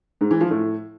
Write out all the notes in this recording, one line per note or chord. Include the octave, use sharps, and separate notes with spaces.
G#2
E3
F3
A2